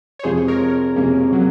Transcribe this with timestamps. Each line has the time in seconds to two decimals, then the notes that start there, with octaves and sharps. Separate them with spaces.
0.19 C#5
0.23 F2 C3 F3 G#3 G#4 C5
0.48 A#4 C#5
0.96 F2 C3 F3 G#3 A#3 C#4
1.32 F#3 A#3